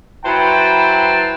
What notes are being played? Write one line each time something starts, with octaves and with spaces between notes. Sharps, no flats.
F#3 E4 B4 C5 G5 A5